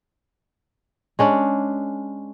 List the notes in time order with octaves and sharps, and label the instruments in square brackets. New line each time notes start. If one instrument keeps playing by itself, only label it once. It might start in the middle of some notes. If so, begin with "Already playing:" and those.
[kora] G#3 C#4 D4